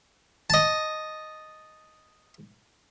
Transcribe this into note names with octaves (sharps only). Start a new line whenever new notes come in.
D#5 A5